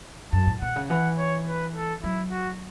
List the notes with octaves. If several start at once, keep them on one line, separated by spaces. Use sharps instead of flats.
F#2 A5
A2
B2 F#5
C#3
E3 F#5
C#5
B4
A4
F#3 E4
F#4